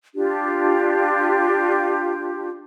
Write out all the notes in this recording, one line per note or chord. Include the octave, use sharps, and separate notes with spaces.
D4 F4 G4